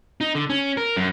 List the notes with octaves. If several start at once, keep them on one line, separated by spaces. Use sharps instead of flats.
D#4
D3
C#4
A#4
F#2